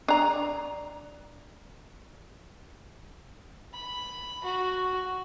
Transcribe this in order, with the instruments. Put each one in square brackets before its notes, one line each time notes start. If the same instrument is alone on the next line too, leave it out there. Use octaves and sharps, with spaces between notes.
[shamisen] D4 A#5
[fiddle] B5
F#4